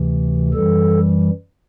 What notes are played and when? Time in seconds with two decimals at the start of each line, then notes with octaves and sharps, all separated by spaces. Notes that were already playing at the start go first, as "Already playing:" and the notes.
Already playing: D2 C3 E3
0.53 F#2 E3 G3 A4